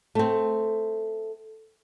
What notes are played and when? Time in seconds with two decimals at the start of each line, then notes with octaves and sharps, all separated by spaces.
0.15 A3 C4